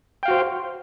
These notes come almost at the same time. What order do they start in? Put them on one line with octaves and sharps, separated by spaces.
G5 F5 F#4 C5